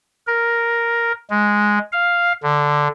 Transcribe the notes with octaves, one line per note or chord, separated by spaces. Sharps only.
A#4
G#3
F5
D3